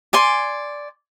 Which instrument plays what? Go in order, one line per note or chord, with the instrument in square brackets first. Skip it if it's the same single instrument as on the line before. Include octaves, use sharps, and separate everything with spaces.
[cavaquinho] D5 G#5 C6